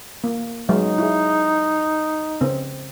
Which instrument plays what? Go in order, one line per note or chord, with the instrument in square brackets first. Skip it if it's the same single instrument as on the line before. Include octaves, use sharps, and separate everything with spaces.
[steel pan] A#3
[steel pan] F#3 G#3 [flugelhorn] D#4
[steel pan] E4 G#4
C#3 C4